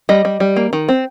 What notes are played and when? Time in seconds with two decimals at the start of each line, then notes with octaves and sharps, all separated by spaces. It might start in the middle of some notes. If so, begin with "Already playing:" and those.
0.09 G3 D#5
0.25 G3
0.40 G3
0.56 A#3
0.73 D#3
0.89 C4